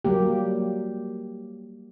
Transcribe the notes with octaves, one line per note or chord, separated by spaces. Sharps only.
F#3 G3 A#3 G4